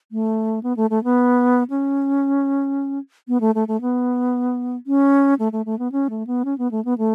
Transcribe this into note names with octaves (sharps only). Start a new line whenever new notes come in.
A3
B3
A3
A3
B3
C#4
B3
A3
A3
A3
B3
C#4
A3
A3
A3
B3
C#4
A3
B3
C#4
B3
A3
B3
A3